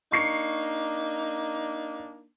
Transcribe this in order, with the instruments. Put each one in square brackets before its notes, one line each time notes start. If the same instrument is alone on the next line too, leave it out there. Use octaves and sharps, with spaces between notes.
[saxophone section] A#3 D4 D#4 [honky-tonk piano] C#6 C7 C#7